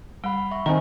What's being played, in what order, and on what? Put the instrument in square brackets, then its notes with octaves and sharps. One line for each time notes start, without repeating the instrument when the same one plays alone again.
[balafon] G3 [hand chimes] F#5 B5
[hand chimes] E5 C#6
[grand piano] D#3 C4 [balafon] G#5 A#5